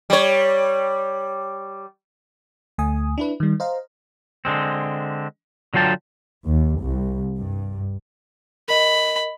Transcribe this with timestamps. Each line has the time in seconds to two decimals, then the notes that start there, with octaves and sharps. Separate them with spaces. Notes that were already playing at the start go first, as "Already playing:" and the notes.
0.10 G3 C#5
2.78 D2 A3 G#5 D#6
3.18 D4 E4 B4
3.40 D#3 G3
3.60 C5 D#5 F5 A#5
4.45 D3 G#3 C4
5.74 D3 F#3 F4 G5 A5
6.47 D#2
6.83 C2
7.38 G2
8.68 A#4 D#5 B5